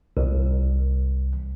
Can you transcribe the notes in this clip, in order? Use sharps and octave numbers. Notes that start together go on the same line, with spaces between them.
C2